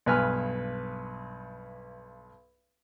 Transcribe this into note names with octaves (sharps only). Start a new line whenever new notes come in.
B1 G2 B4 G#5 F6